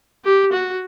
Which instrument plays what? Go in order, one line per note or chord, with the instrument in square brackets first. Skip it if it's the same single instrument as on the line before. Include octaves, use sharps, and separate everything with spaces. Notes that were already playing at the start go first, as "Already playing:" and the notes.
[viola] G4
F#4